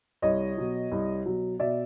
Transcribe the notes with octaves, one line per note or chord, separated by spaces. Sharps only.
C2 C#5 D#5
B2 F#3
C2
B2 F#3
B2 D5 E5